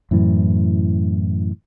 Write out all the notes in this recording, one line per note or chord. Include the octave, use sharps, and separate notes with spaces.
F#2 A2 E3